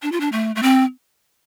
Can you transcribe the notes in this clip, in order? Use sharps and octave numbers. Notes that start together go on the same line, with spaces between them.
D4
F4
D4
A3
A3
C4